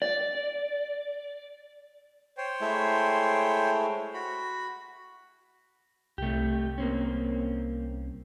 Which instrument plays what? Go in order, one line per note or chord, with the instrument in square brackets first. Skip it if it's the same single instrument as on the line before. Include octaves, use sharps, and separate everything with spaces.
[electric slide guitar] D5
[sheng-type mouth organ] C5 C#5 G5
[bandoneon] G#3 A3 E4
[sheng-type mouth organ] F#4 [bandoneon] B5
[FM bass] C2 [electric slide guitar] A3 G4
[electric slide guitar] A#3 C4 C#4